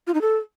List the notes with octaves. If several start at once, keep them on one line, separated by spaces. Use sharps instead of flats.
F4
D#4
A4